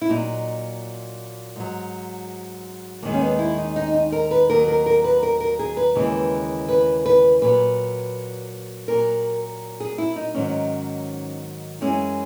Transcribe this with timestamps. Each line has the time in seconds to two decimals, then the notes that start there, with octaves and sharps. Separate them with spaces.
0.02 E4
0.09 A#2 F#3 D#4
1.56 G#2 F#3
3.02 D#2 D#3 G#3 A#3
3.14 C#4
3.21 B3
3.39 E4
3.58 D#4
3.76 D#4
3.94 D#4
4.12 A#4
4.31 B4
4.50 D#2 D#3 F#3 A#4
4.68 A#4
4.86 A#4
5.04 B4
5.23 A#4
5.40 A#4
5.59 G#4
5.77 B4
5.95 D#2 C#3 E3 G#3
6.68 B4
7.06 B4
7.41 A#2 F#3 B4
8.88 A#2 F#3 A#4
9.80 G#4
9.98 E4
10.16 D#4
10.34 G#2 D#3 F#3 C#4
11.81 F#2 E3 G#3 C#4